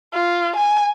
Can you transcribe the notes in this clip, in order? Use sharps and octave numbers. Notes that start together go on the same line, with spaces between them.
F4
G#5